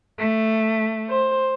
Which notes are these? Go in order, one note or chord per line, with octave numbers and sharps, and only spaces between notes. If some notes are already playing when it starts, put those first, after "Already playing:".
A3
C5